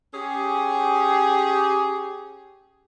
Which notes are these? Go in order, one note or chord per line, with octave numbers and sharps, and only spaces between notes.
C#4 G4 G#4